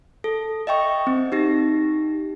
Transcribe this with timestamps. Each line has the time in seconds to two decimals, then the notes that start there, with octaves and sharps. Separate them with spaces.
0.24 A4
0.67 D#5 E5 G5 C#6
1.07 C4
1.32 D#4 G4 A#6